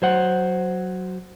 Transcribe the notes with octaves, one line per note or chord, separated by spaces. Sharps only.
F#3 C5 F#5